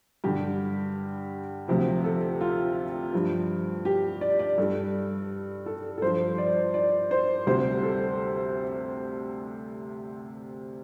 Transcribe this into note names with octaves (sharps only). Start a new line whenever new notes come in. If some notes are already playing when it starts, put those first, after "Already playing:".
G2 D3 G3 G4
D2 C3 F3 G4
A4
F4
G2 F3
G4
D5
D5
G2 G3 A4
A4
A4
G2 F3 C5
D5
D5
C5
D2 C3 G3 C5
A4